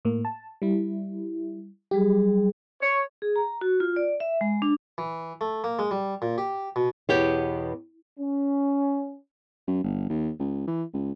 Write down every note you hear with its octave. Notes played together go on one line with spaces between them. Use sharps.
A2 A#3
A5
G3 E4
F#3 G3 G4 G#4
C#5
G#4
A#5
F#4
F4
D5
E5
G#3
D4
E3
A3
A#3
G#3
G3
A#2
G4
B2
E2 B2 B3 G4 C#5
C#4
F#2
G1
D#2
C#2
E3
C#2